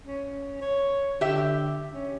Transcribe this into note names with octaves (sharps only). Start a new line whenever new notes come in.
C#4
C#5
D3 G4 E5
C#4